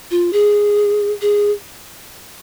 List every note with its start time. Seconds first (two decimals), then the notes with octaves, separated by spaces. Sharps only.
0.11 F4
0.33 G#4
1.21 G#4